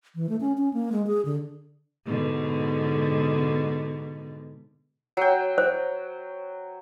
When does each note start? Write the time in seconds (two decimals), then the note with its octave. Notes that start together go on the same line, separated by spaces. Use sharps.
0.15 E3
0.29 A3
0.41 C#4
0.58 C#4
0.74 A#3
0.92 G#3
1.07 G#4
1.25 D3
2.06 G#2 B2 D3
5.17 F#3 G5
5.58 C5